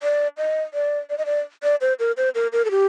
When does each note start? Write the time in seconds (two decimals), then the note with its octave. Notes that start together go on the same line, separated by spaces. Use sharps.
0.03 D5
0.38 D#5
0.74 D5
1.10 D5
1.18 D#5
1.26 D5
1.63 D5
1.81 C5
1.99 A#4
2.17 C5
2.35 A#4
2.53 A#4
2.65 A4
2.71 G4